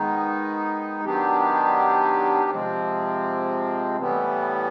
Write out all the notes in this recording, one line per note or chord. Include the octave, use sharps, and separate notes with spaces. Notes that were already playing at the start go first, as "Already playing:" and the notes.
Already playing: D#3 G#3 B3 D#4
D#3 F#3 B3 D4 G4
C3 F3 G#3 C4
A2 E3 G3 B3